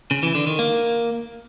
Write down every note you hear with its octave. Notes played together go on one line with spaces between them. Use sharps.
C#3
E3
D3
D#3
A#3